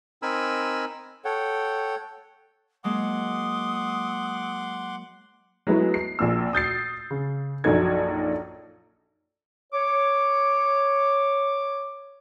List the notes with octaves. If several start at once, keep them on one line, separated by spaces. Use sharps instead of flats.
C4 D#4 A#4 G#5 B5 E6
A4 C#5 F#5 G5
F#3 G#3 A#3 F#5 C6 D6 D#6
F#3 G#3 A3 B3 E4
C7
A#1 A#2 E6
D#6 G6 A6 C7
C#3
A#1 F#2 F#3 D#4 A4 G#6
C#5 D6